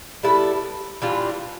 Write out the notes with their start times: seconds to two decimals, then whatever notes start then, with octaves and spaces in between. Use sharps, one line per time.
0.23 G3 B3 E4 A4
1.02 E3 G3 D4 F4